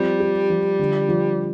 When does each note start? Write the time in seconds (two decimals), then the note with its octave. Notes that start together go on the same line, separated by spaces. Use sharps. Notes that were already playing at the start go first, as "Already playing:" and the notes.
Already playing: F3 G3 C4
0.20 G4
0.50 F3
0.79 D3
1.09 F3